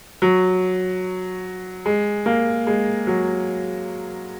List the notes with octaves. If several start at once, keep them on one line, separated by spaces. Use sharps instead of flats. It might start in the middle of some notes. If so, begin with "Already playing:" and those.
F#3
G#3
A#3
G#3
F#3